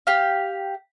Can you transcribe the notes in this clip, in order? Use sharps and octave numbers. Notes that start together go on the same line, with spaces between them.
G4 F5